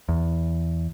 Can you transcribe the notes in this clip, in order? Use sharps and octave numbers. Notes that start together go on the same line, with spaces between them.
E2